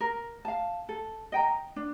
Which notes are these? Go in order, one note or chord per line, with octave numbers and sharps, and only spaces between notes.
A#4
F5 A5
A4
D#5 G5 A#5
D4